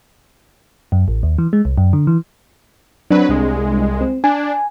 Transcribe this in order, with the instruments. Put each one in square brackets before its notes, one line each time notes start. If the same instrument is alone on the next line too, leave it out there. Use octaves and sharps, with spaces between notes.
[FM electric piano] F#2
A1
D#2
E3
G#3
C2
F#2
D3
E3
[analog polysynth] F#3 B4 [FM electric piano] C4 D4
[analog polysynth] C2 G#3
[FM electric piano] C4
[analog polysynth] D4 [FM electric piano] G#5